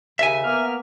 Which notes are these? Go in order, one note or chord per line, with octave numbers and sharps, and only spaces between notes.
D#2 C#3 E5 G#5
A#3 B3 F6